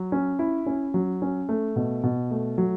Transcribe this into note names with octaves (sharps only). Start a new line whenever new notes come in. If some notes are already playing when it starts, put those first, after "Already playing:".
Already playing: F#3
C#4
E4
C#4
F#3
C#4
A3
B2
B2
A3
F#3